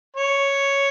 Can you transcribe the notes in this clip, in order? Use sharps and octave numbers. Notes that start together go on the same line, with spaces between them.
C#5